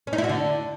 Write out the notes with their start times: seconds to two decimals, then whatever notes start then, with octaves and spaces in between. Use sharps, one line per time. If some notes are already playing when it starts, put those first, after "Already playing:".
0.07 C#4
0.13 D#4
0.18 E4
0.24 F#4
0.29 D3